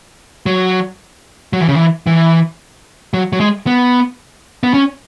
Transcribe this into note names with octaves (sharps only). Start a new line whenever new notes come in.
F#3
F#3
E3
C#3
E3
E3
F#3
F#3
G#3
B3
B3
C#4